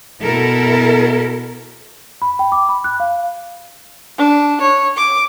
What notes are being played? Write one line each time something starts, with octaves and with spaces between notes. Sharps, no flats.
B2 E4 A4 A#4
B5
G5
D6
B5
F#6
F5
D4
C#5
D6